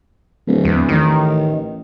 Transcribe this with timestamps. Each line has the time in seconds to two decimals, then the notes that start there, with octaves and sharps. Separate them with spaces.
0.47 D1
0.65 E2
0.89 A1 D#3